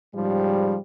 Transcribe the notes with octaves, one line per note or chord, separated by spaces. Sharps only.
G#2 C#3 F3 G3